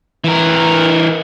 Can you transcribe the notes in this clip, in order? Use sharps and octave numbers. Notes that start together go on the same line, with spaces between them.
E3 A#4